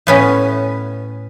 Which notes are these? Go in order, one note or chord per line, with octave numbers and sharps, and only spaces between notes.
A2 B3 C#4